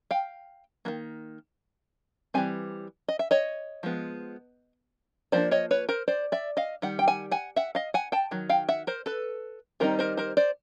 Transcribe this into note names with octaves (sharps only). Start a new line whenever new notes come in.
F5 G5
D#3 F#3 A#3
E3 G3 C4 G#5
D#5
E5
C#5 D#5
F3 G#3 B3
F3 A#3 D4 C5 D5
C#5 D#5
B4 C#5
A#4 C5
C5 D5
D5 E5
D#5 F5
D#3 G3 F#5
G5
F#5 G#5
F#5 G#5
E5 F#5
D#5 F5
F#5 G#5
G5 A5
D#3 F#3
F5 G5
E5 F#5
A#4 C5
A4 B4
D#3 G3 C4 D#4 A#4 C5
A#4 C5
A#4 C5
C5 D5